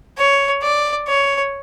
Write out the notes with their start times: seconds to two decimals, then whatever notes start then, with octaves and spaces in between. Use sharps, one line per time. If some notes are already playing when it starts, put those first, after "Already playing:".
0.18 C#5
0.62 D5
1.08 C#5